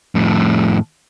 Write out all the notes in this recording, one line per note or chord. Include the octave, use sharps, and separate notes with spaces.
F2 A2